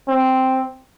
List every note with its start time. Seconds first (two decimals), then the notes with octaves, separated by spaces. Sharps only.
0.08 C4